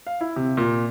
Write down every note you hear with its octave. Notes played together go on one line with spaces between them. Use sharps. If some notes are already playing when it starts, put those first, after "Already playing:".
F5
E4
C3
A#2